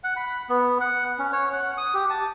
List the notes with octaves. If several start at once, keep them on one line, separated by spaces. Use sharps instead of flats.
F#5
B5
B3
F#5
C#4
C#5
F#5
D#6
G4
A5